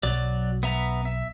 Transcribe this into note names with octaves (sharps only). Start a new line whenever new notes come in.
B1 F#3 D5
B3 E5 A#5
E5